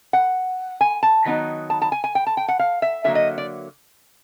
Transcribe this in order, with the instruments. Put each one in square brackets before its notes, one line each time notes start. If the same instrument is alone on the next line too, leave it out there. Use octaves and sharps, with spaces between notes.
[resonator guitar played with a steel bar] F#5
G#5
A5
D#3 F#3 B3 D#4
A5
A5
G#5
G#5
G5
A5
G5
F#5
F5
E5
D3 F#3 A#3 E5
D#5
D5